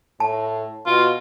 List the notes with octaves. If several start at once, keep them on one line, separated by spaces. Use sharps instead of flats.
A2 A5
B2 F4